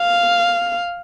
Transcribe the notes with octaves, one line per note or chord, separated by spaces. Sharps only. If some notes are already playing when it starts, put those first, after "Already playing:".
Already playing: F5